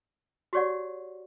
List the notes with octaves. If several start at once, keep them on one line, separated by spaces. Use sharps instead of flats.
F#4 G4 C#5 D5 F#5